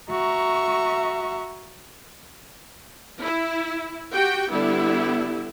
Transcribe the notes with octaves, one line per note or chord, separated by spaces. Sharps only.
F#4 E5 A#5 C#6
E4
F#4 G4 G5
D3 G3 B3 E4